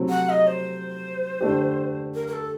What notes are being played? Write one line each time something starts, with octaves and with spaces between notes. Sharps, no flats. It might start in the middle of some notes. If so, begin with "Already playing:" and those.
Already playing: C3 F#3 A3 C4
F#5
D#5
C5
D3 A3 D4 G4
A#4
A#4
A4